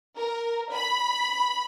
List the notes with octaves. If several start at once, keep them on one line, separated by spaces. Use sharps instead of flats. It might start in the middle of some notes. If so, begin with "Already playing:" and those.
A#4
B5